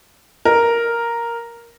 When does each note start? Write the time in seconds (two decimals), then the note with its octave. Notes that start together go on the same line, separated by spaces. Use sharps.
0.45 A#4